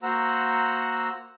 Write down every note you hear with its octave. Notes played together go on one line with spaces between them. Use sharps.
A#3 F#4 C5 F#5 A#5 E6